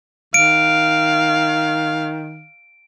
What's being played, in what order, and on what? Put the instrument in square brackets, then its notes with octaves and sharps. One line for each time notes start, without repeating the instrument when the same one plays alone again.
[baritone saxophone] D#3 [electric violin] F5 [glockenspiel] D7